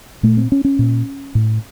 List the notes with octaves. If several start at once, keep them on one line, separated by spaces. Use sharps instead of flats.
A#2 A3
C4
C#4
C#4
A#2
A2